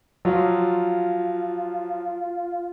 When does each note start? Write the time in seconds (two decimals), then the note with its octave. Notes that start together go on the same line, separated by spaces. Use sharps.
0.25 F3 F#3 F4